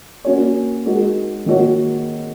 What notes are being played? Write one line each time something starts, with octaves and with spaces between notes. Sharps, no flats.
A#3 C#4 F#4 C#5
G#3 D#4 F#4 A#4
D#3 A#3 D#4 F#4 C#5